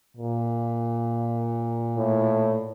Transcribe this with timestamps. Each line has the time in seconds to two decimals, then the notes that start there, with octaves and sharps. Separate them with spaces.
0.17 A#2
1.97 A2